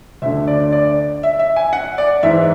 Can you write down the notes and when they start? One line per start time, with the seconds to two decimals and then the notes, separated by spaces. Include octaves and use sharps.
0.22 D2 E5
0.26 D3
0.48 D5
0.72 D5
1.23 E5
1.39 E5
1.56 G#5
1.73 F#5
1.98 D5
2.23 G#2 E3 E5